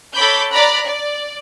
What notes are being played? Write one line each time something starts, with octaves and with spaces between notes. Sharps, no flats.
A4 C#5 B5 D6 G6
D5 A#5 B5 F#6
D5